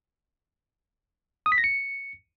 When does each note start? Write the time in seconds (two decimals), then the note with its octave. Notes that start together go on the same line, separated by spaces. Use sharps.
1.46 D#6
1.52 B6
1.58 A#6
1.64 C#7